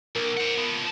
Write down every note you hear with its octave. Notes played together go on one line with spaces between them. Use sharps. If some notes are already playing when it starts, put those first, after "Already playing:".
B1 A#4
C5 F#5
F3 B3